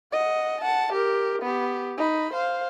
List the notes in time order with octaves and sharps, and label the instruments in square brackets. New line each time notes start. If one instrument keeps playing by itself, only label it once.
[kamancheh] D#5 F#5
F#5 A5
G4 A#4
B3 G4
D#4 B5
C5 F5